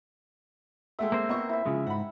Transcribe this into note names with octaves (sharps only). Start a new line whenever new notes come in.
G#3 A3 E5 F#5 G5
A#3 C4 C5
B3 D#5 C#6
E4 E5
C#3 F3 G#3
G#2 F#5 B5